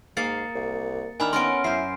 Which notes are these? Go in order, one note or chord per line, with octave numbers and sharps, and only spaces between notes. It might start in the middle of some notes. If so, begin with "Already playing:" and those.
G#2 A#3 G#4 F5 A6 C#7
C2
D#3 D4 E4 G#5 B5 F6
B3 C#4 A#4 C6 D7
F#2 E4 C5 C7